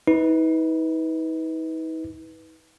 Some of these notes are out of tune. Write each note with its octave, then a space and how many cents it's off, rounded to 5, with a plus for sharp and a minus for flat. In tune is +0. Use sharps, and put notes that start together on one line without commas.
D#4 +45 B4 +0